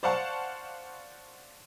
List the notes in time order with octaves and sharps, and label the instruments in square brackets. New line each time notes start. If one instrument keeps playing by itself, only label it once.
[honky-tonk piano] C5 D5 F5 F#5 A5 C#6